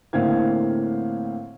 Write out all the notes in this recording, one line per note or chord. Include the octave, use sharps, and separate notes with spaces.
A2 D3 A#3 C4 F5 G#6